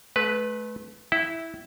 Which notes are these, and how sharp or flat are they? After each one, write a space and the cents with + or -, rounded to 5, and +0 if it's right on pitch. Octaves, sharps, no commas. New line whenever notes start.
A3 -35 B4 +0
E4 -10 E5 +0 G5 -45